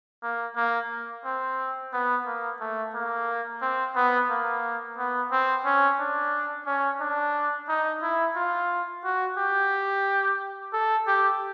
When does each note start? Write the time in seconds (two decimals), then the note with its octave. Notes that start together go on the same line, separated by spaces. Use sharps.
0.23 A#3
0.56 A#3
1.25 C4
1.93 B3
2.26 A#3
2.61 A3
2.94 A#3
3.62 C4
3.96 B3
4.30 A#3
4.98 B3
5.32 C4
5.65 C#4
5.99 D4
6.66 C#4
7.01 D4
7.68 D#4
8.02 E4
8.36 F4
9.04 F#4
9.38 G4
10.73 A4
11.07 G4